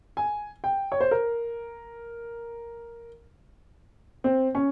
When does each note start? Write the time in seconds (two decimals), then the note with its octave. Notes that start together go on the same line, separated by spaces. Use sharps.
0.17 G#5
0.64 G5
0.92 C#5
1.01 C5
1.11 A#4
4.24 C4
4.55 C#4